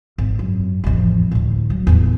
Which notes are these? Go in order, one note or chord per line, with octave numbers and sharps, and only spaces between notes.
G#1
F#2
A1 F2
D2 A2
F#3
E2 A2